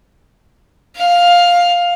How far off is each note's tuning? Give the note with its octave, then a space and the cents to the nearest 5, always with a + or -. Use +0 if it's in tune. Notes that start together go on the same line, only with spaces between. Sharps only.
F5 +10